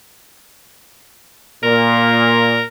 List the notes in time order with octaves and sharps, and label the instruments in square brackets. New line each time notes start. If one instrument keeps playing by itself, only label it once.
[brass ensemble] A#2 [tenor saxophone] A#4